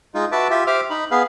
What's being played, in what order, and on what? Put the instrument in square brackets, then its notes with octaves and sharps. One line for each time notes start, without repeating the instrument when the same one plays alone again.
[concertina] G#3 D#4 F4
F#4 B4 E5 A5 D6
F4 G4 E5
G4 C5 E5 D6 F6
D#4 B5
B3 G#4 B4 F5